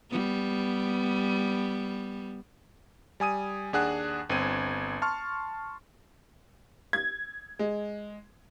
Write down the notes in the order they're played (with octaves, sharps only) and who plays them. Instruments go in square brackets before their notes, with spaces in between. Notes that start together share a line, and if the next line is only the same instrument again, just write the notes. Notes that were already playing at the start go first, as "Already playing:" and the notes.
[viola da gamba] G3 B3
[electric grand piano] G3 G#5 D#6 D#7
D#2 D4 G#4 F#5 F#6
G1 C4 D#7
A5 C6 C#6 F6
[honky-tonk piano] G#6
G#3